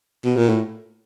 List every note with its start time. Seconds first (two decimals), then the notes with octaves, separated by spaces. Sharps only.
0.25 B2
0.36 A#2
0.49 A2